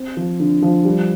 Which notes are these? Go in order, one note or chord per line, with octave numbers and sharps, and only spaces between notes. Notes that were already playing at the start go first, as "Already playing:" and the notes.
Already playing: C4
F3
D3
F3
G3